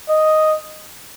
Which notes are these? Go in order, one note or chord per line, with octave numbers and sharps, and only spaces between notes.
D#5